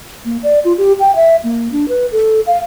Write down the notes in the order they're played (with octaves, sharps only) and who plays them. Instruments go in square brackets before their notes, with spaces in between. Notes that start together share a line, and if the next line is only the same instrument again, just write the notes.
[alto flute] A#3
D5
F4
G4
G5
E5
A#3
D4
B4
A4
F5